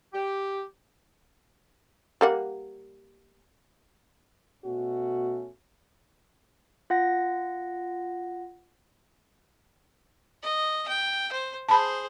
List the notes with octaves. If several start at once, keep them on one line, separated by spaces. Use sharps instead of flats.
G4
G3 A#3 F#5
B2 A3 C#4 F#4
F4 F#5 A#6
D#5
G5
C5
G#4 C5 A5 B5